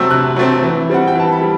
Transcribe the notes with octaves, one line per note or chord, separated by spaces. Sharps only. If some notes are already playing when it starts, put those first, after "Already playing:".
Already playing: C3 F#3 A3 C4 E6
C3 F#6
F#3 A3 C4
E3
G3 C4 F#5
G5
E3 A5
B5
G3